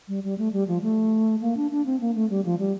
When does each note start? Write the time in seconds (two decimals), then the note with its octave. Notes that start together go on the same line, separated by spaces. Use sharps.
0.08 G3
0.24 G3
0.38 A3
0.53 G3
0.68 F3
0.82 A3
1.41 A#3
1.57 D4
1.71 D4
1.86 C4
2.00 A#3
2.15 A3
2.30 G3
2.45 F3
2.59 G3